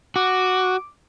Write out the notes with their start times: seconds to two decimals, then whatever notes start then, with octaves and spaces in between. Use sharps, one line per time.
0.16 F#4 D6